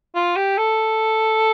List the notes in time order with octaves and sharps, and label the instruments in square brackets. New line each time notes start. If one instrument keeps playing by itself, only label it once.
[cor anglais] F4
G4
A4